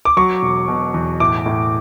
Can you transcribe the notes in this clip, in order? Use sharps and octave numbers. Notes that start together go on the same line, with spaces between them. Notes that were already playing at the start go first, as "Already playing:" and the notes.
D6
F#3 C#6
E1
B2
E2
A2 D6
A2